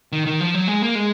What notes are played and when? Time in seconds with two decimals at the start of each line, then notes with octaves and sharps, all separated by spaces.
0.12 D#3
0.26 D#3
0.40 F3
0.54 F#3
0.68 G#3
0.82 A#3
0.95 G#3